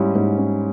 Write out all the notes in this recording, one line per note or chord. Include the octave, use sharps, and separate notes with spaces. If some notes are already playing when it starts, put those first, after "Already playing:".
Already playing: G#2 G3 C#4 E4
G#2
C#4